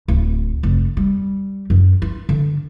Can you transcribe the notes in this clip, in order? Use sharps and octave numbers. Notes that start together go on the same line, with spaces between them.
D1
F1
G3
F#2
F4
D3